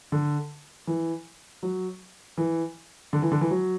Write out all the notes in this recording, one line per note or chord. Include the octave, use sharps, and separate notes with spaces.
D3
E3
F#3
E3
D3
E3
D3
E3
F#3